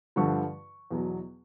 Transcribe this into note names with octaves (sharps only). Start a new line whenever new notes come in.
G2 D3 F3 C#6
E2 B2 F#3